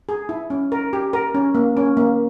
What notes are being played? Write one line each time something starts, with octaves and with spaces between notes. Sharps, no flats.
G#4
E4
C#4
A#4
G4
A#4
C#4
A#3
C#4
A#3